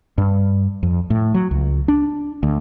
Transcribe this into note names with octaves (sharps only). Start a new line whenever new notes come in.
G2
F2
A2
F#3
C#2
D4
D2